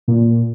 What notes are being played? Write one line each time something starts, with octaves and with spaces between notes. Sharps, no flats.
A#2